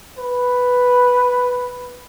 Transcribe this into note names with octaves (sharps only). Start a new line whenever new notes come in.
B4